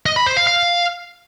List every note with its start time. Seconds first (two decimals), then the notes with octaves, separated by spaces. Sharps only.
0.06 D#5
0.16 B5
0.26 C5
0.37 F5
0.47 F5